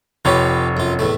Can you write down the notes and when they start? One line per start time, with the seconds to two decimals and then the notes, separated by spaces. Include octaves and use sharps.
0.25 F1 F4 G4 B4 C#5
0.77 F#2 F4
0.99 E2 A2 A3